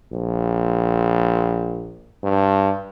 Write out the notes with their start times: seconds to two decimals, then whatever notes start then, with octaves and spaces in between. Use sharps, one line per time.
0.12 A#1
2.23 G2